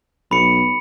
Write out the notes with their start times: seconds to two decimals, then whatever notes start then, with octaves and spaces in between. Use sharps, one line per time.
0.31 B1 B5 C#7